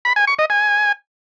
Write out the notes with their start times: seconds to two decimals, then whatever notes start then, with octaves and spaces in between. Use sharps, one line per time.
0.05 B5
0.16 G#5
0.27 C#6
0.39 D#5
0.50 G#5